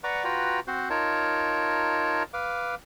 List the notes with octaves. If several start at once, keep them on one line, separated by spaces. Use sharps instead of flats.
B4 D5 F#5 A#5 C#6 D6
F4 F#4 B4 G5 A#5
C4 F#4 C5
D#4 F4 A#4 C#5 A5
B4 F5 D6